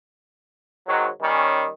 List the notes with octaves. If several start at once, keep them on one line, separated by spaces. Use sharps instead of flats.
G#2 D#3 F#3
D#3 G3 C#4